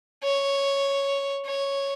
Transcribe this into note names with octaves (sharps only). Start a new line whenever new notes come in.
C#5
C#5